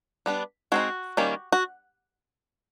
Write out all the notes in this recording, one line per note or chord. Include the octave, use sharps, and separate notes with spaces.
G3 B3 D4
G#3 C4 D#4 F#4
D#3 G3 A#3 C#4
F#4